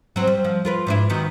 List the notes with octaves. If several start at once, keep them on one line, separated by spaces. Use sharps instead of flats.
F#3 C4
G3
F3
F4 A#4 B4
G#2 D4 E4
D#3 F#3 B3